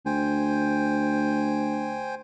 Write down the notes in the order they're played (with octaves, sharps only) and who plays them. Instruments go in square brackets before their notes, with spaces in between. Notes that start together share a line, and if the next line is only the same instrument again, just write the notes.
[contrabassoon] D2 [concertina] C5 G5 G#5